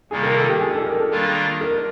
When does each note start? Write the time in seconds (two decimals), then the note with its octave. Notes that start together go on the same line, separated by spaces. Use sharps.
0.11 C3 D#3 G3 A#3 G#4
0.23 A#4
0.37 A4
0.49 G4
0.61 G#4
0.74 A4
0.86 A#4
0.98 A4
1.11 D#3 G3 A#3 D4 F4
1.61 A#4